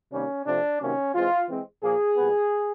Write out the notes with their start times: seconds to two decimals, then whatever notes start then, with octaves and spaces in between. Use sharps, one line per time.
0.12 C3 D#3 G3 A#3 C#4
0.46 C3 F3 A3 C4 D4
0.80 C3 D#3 F#3 A#3 C#4
1.14 E3 G#3 C4 F4
1.48 E3 G#3 C4
1.82 A#2 F3 A#3 G#4
2.16 A#2 G3 B3